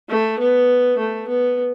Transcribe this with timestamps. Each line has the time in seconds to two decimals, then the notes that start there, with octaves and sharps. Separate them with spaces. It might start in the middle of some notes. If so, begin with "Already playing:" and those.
0.09 A3
0.39 B3
0.99 A3
1.28 B3